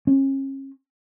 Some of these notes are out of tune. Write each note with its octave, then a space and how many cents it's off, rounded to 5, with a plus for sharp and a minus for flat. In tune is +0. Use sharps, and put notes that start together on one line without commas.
C#4 -35